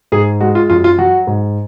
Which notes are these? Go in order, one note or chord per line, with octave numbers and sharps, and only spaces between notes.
G#2 G#4
G#3 F#4
F4
F#2 F4
F4
F#3 F#4
G#2